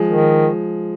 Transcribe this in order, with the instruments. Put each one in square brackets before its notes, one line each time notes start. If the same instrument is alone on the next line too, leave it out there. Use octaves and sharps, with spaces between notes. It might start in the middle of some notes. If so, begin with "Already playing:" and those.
Already playing: [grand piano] F3 G#3
[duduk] D#3